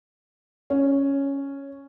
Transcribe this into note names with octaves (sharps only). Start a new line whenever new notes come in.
C#4